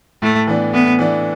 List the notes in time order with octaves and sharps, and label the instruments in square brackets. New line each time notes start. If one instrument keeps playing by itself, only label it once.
[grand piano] A2 [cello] A3
[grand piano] E3 B3 D4
[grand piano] A2 [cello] B3
[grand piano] E3 B3 D4